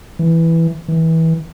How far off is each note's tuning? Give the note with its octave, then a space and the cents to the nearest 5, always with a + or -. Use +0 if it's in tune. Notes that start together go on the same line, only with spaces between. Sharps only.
E3 +0
E3 -25